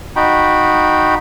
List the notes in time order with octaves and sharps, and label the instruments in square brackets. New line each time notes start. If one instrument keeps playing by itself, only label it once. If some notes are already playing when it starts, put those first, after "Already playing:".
[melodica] D#4 F#4 G5 B5